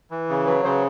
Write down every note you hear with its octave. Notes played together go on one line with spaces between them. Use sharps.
E3
C#3
F#3 B4
C#3 C5